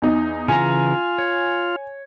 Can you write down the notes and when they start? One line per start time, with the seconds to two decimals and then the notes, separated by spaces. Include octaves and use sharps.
0.02 E2 D#4
0.48 C#3 E3 F4 G#5 A#5
1.18 C#5